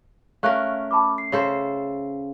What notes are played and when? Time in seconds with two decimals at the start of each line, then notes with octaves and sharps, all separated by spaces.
0.43 A3 C#4 A#4 F5 F#6
0.91 A5 B5 D6
1.18 C7
1.32 C#3 A4 C5